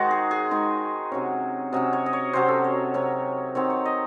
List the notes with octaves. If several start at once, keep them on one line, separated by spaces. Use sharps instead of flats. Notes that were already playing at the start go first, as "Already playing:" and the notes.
Already playing: D#3 G#3 D#4 F#4 C5
G#4
G#4
D#3 G#3 D#4
C3 F#3 C#4 C#5
C3 F#3 C#4 D#5
C#5
D#5
C#5
C3 F#3 C#4 C5
A4
C#5
C3 F#3 C#4 C#5
D#3 F#3 C4 D#4 C#5
C#5
D#5